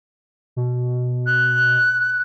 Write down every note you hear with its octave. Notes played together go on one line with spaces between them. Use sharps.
B2
F#6